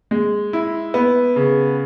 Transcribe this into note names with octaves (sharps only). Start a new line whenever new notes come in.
G#3
E4
B3
C#3